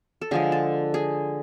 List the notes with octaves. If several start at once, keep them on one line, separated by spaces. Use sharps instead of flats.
A4
D3 F3 G#3 G#4
A4
G#4